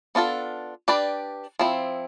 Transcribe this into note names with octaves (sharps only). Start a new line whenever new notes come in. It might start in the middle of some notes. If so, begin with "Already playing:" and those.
B3 D4 F4 A4
D4 G4 B4 D5
F3 C4 E4